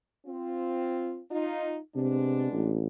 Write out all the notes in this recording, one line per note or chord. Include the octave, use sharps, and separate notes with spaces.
C4 F4
D#4 F4
C3 G#3 B3 D4
A1